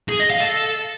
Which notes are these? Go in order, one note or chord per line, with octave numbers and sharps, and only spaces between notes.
G#4
D#5
F5
A4